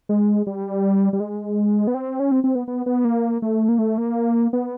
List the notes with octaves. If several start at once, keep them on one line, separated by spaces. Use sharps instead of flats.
G#3
G3
G3
G#3
B3
C4
C#4
C4
C4
B3
B3
B3
A#3
A3
A#3
A3
A#3
B3